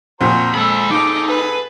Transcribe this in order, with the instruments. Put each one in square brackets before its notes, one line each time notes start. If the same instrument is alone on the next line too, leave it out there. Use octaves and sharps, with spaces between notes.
[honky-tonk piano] F2 A#2 C4 [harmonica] F#4 C5 A#5
[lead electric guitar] G#3 B5 [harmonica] A4 E6
[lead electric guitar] D#4 [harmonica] G#4 A4 [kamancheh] D6
[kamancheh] B4